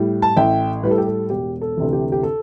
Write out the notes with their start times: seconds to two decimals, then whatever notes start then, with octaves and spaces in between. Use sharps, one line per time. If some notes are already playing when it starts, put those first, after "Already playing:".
Already playing: A2 G3
0.22 A5
0.36 A1 E5 G5
0.83 A2 G3 B4
0.91 A4
0.98 G4
1.06 A4
1.30 E1 G4
1.62 A4
1.77 D2 C3 E3
1.93 G4
2.12 G4
2.23 A4